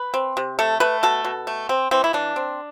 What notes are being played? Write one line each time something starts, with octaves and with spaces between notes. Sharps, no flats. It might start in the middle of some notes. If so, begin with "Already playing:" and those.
Already playing: B4
C4
C3
A3 A4
A3 B4
B2 A4
B2
A3
C4
E3 C4
E4
E3 D4
C4